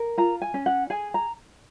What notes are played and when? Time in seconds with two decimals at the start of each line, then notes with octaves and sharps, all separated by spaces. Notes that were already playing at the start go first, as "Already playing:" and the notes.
Already playing: A#4
0.18 F4 A#5
0.42 G#5
0.54 C#4
0.66 F#5
0.90 G#4 G#5
1.14 A#5